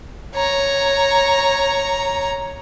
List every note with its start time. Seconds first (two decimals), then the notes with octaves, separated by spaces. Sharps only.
0.35 C#5 A#5